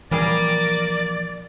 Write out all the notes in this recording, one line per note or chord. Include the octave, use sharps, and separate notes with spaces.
A#2 E3 F3 G3 A#3 G#4 D5 D6